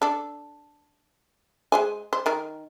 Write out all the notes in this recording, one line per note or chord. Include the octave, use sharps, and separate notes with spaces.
D4 A4
G#3 C5 G#5
C5
D#3 A#4